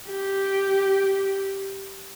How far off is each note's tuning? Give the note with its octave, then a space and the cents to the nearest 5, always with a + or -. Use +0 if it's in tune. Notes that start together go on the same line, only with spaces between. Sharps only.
G4 -5